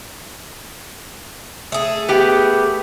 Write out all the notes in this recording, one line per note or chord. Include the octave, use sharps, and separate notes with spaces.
A3 G#4
B3 G4 G5